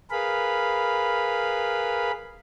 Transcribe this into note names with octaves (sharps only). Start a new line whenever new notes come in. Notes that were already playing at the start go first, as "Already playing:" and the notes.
G#4 A#4 B4 F5 B5